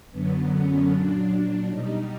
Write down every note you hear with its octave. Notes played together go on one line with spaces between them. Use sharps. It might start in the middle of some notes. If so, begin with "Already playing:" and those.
F#2 D3 F#3 B3
C#4
A#2 F#3 D4
B2 G3 D#4